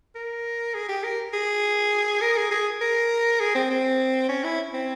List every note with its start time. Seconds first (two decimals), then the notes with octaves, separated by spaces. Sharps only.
0.15 A#4
0.75 G#4
0.89 G4
1.04 A#4
1.34 G#4
2.22 A#4
2.37 G#4
2.51 G#4
2.81 A#4
3.40 G#4
3.55 C4
3.70 C4
4.29 C#4
4.44 E4
4.74 C4